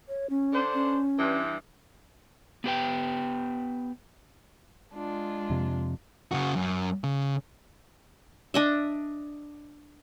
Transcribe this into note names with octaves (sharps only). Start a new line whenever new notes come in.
C#5
C#4
D3 D4 C5
C#4
G2 E3
B3 G4 B4 G5
G#3 D4 F4
F2 C3
C#3 F#4
F#2
C#3
D4 D#5 E5